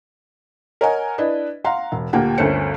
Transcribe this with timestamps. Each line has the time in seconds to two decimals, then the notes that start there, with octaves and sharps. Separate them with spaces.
0.81 A#4 C#5 D#5 F#5 G#5
1.18 D4 E4 B4 D#5
1.64 F5 F#5 A#5 C6
1.92 E1
2.13 D2 A#2 A#3 G4 F#5 G5
2.38 G1 D2 C#4 A#4 C5 C#7